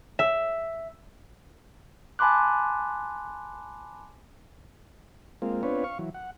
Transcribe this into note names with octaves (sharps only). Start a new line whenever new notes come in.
E5
G#5 A5 B5 C6 D6 F#6
G#3 A#3 C4 F4
B3 C4 D4 F4 B4 C#5
F5 C#6
E3 F#3
F#5